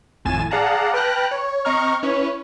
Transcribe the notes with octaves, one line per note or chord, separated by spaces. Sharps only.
G#1 F2 A2 G#5 A6 E7
G#4 D5 F5 F#5 A5 A#5
B4 G5 A5 F6 F#6 A#6
C#5
C4 D#5 A#5 C#6 F6
C#4 E4 B4 C#5